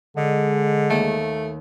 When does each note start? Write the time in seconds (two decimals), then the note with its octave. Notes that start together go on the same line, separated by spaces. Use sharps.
0.17 D3 G#3 D#5
0.90 D#2 A3